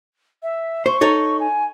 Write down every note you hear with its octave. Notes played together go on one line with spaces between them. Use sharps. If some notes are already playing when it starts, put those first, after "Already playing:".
E5
C5 C#6
D#4 A4 C#5
G#5